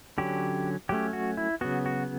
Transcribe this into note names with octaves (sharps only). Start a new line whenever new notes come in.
D3 F#3 C#4 G4
F#3 A3 C#4 G4
F#4
E4
C#3 F#3 B3 F#4
F#4